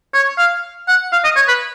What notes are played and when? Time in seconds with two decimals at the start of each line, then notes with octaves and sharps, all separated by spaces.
0.14 C#5
0.38 F5
0.88 F#5
1.12 F5
1.24 D#5
1.36 C#5
1.48 B4